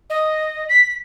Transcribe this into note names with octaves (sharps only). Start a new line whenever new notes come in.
D#5
B6